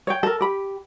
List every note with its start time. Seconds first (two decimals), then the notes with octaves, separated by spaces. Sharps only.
0.07 C#5 F#5 G5
0.23 A4 A#4
0.41 G4 B5